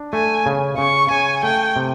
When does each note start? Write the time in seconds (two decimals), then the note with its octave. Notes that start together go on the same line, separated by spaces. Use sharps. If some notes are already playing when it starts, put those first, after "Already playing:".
Already playing: D4
0.13 A3 G#5
0.46 C#3
0.78 C#3 C#6
1.11 C#3 G#5
1.43 A3 G5
1.76 C3